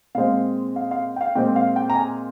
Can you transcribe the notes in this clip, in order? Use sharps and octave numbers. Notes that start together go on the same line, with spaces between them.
A#2 G#3 C4 F5
F5
F5
G5
F5
A#2 G#3 C4 G5
F5
G5
A#5
G#5